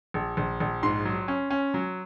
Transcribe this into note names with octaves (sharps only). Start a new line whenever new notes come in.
A#1
A#1
A#1
G#2 C6
F#3
C#4
C#4
F#3